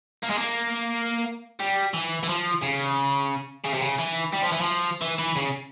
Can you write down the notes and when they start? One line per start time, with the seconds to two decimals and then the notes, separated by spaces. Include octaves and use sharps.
0.23 A#3
0.30 G#3
0.38 A#3
1.60 G3
1.94 E3
2.23 E3
2.28 F3
2.63 C#3
3.65 C#3
3.74 C3
3.82 C#3
3.99 E3
4.33 G3
4.42 F3
4.52 E3
4.61 F3
5.01 E3
5.19 E3
5.36 C#3